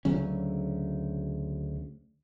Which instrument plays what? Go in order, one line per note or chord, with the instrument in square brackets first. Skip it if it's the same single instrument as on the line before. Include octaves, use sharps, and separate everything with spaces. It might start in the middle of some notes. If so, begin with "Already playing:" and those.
[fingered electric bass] D2 C#3 F#3 C#4